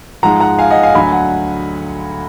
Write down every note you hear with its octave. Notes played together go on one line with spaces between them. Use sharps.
G#2 F3 G#3 F#5 A#5
F#5 A#5
F5 G#5
D#5 F#5
F5 G#5
D2 D3 F#3 G#5 B5
F#5